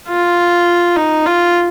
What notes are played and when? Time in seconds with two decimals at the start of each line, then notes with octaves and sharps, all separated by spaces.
0.09 F4
0.96 D#4
1.26 F4